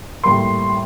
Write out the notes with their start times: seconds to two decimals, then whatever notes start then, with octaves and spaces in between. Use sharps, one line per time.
0.24 A2 G3 A#3 C6